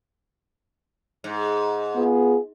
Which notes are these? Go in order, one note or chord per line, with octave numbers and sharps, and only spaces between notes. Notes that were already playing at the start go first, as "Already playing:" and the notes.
G#2
B3 F4 G#4